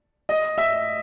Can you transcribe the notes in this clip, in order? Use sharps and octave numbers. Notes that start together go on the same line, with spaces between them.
D#5
E5